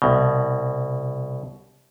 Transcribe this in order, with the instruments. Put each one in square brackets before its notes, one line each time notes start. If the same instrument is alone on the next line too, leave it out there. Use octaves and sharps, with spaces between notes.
[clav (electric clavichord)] C2 B2